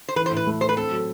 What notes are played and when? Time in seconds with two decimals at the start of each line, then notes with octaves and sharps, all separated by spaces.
0.08 C5
0.16 E3 B4
0.26 C5
0.31 A2
0.37 B4
0.47 A3
0.61 E4 C5
0.69 B4
0.76 C4 A4
0.91 F#3